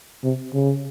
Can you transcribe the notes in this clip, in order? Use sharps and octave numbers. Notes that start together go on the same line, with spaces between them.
C3
C#3